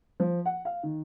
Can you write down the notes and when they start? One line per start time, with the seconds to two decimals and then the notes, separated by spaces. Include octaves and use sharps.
0.20 F3
0.45 F#5
0.65 F5
0.83 D#3